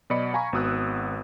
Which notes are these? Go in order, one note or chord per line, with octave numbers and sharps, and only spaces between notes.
B2 F#3 D5 D#5 B5 C#7
F5 G#5 A#5 B5 C#6
G#1 B3 F#4 D#6 E6 F#6